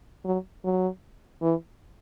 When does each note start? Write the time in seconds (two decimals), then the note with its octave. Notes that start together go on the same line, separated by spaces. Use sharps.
0.25 F#3
0.64 F#3
1.42 E3